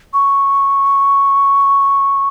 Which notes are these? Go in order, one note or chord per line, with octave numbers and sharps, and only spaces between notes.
C#6